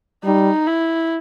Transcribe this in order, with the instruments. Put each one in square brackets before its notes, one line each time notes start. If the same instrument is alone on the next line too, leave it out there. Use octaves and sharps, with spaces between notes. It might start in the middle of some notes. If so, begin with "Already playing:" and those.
[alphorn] G3 [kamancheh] D#4
[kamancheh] E4